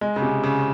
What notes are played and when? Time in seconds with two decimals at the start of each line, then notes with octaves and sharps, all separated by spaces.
0.01 G#3
0.16 C#3
0.22 C3
0.44 C#3